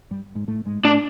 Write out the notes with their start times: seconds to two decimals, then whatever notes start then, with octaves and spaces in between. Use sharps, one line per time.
0.11 G2 G3
0.35 G#2 G#3
0.48 A2 A3
0.66 G#2 G#3
0.84 A2 A3 D4